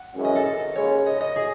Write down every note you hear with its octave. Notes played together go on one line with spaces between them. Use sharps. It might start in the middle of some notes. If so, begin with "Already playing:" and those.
Already playing: F#5
G#1 F#2 E3 G#3 C#4
D#5
A4
A4
D#2 C#3 G#3 C#4 C#5
D#5
D#5
G#4